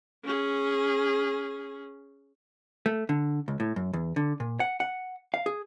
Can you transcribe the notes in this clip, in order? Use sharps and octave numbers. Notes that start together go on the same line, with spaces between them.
C#4 G#4
A3
D3
C#2
A2
F#2
E2
D3
A#2
F#5
F#5
F5
G#4